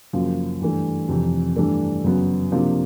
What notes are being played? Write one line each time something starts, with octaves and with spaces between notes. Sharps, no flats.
F#2 C#3 F3 A#3
G2 E3 A3
F2 C3 E3
G2 E3 A3 D4
F#2 C#3 F#3 B3
C3 F3 A#3 D4